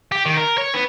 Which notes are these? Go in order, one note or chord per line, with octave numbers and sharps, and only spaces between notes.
G4
D#3
A#4
C#5
B3